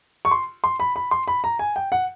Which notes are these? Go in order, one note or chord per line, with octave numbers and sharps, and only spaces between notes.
C#6
C6
C6
B5
B5
C6
B5
A#5
G#5
G5
F#5